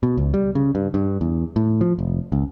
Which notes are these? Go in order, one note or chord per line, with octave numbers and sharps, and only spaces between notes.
B2
C#2
G3
C#3
G2
G2
E2
A2
F3
F1
C#2